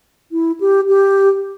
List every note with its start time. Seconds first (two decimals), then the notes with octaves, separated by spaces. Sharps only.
0.32 E4
0.61 G4
0.89 G4